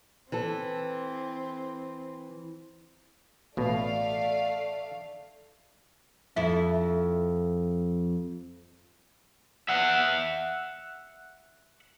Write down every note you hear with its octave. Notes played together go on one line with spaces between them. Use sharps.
E3 C4 A4
A1 B2 A3 D5 F5
F2 E4
E5 F#5